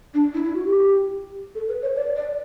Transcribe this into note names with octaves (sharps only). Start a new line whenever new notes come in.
D4
E4
E4
F#4
G4
A4
B4
C#5
D5
D5